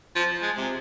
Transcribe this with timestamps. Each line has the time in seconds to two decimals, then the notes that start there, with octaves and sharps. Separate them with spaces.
0.16 F3
0.42 G#3
0.57 C3